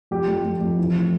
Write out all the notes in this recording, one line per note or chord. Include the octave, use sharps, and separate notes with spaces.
F2 G4
F2
F2
F2
E3
A2